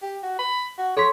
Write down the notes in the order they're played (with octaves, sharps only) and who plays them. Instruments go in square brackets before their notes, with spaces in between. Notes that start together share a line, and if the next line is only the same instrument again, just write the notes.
[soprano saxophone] G4
F#4
B5
F#4
[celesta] A4 C6 B6 [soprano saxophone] C#5